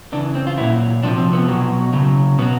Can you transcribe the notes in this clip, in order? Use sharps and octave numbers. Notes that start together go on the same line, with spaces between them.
C#3 E3 D4
C4
F4
A#2 F#3 E4
C3 F3 D4
C4
B3
B2 F#3
C#3 F#3
B2 F#3 B3